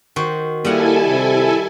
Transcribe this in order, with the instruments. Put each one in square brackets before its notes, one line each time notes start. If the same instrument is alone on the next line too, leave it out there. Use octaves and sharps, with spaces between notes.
[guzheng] D#3 F#4 C5
[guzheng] G3 D#5 F#5 [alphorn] A#3 [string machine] E4 A4 G#5
[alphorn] C3